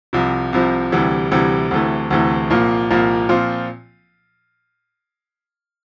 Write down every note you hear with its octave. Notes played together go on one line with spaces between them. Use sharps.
C2 C3 F3
C2 C3 F3
D2 C3 E3 G3
D2 C3 E3 G3
D2 C3 E3 A3
D2 C3 E3 A3
C2 A#2 F3 A#3
C2 A#2 F3 A#3
A#2 F3 C4 F4